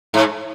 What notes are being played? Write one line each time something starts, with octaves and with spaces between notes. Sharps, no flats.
G#2